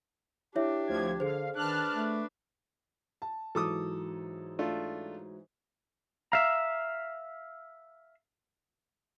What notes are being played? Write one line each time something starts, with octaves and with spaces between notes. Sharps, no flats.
D4 E4 G4 C#5 E5
D2 F3 G#6
D3 G#4 C5 F5
D#3 D4 B4 A5 F6 F#6
A3
A5
G#2 E3 F#3 A4 D6 D#6
A3 D4 F4
E5 F5 A#5